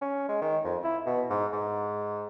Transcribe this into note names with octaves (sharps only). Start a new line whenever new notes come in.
C#4
G#3
D#3
F2
E4
B2
G#2
G#2